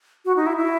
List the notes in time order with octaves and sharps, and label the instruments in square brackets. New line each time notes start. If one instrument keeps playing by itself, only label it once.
[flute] F#4
D#4
E4
E4